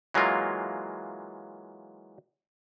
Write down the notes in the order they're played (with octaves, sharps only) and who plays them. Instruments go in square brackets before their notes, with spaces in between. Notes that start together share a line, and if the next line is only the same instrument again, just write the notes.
[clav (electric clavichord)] E3 F#3 G#3 A#3 F4